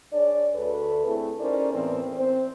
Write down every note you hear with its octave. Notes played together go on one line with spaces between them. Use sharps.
D4 G#4 C#5 D5
D2 A4 B4
A3 C4 E4 G#4 A4
C#4 D#4 A#4 C5 D5
E2 A2 E3 B3 C4
C4 C5